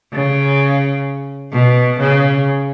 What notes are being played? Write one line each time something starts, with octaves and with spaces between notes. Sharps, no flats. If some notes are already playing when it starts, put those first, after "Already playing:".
C#3
B2
C#3